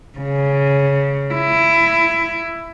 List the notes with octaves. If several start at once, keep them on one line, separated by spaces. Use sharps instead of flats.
C#3
E4